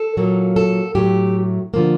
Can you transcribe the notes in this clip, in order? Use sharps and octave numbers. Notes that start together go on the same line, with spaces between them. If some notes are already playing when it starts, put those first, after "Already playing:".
Already playing: A4
A#2 F#3 A#3
A4
A2 F#3 A3 G4
D3 F3 A#3